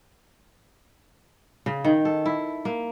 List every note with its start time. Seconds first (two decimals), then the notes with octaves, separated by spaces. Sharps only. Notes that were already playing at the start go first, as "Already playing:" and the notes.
1.66 C#3
1.84 D#3
2.05 A4
2.25 E4
2.65 A#3